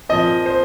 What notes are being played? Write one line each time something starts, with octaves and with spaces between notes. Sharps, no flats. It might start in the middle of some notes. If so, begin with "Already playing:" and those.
A#2 F3 C4 D#5
C5